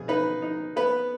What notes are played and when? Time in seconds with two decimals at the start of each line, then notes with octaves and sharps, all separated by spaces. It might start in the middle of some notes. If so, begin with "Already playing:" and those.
Already playing: B2 G#4
0.08 D#4 B4
0.42 D#4
0.76 B3 B4